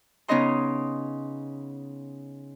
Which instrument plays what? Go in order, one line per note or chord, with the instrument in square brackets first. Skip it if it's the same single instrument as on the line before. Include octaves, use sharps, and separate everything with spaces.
[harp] C#3 B3 C#4 D#4 D#5 C6